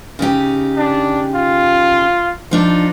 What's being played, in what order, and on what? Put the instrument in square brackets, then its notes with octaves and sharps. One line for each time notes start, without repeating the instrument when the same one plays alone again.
[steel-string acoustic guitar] C#3 D#4 G4
[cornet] D4
F4
[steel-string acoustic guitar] F3 D4 D#4